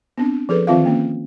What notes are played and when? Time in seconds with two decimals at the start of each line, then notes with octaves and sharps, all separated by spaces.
0.18 B3 C4 D4
0.49 F3 G#4 A4 B4
0.67 D#3 E3 C4 F4 E5 F5
0.86 A#3 C#4